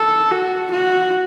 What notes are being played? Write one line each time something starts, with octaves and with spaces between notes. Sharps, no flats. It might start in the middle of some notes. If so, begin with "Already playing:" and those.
Already playing: A4
F#4
F#4